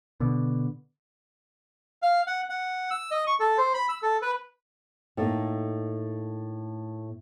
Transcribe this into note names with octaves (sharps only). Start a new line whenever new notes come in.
B2 D3
F5
F#5
F#5
E6
D#5
C#6
A4
C5
B5
E6
A4
B4
A2 A3 A#3 D#4